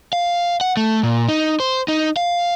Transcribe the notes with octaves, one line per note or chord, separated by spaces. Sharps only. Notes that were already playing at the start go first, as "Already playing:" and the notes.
F5
F#5
A3
A#2
D#4
C5
D#4
F5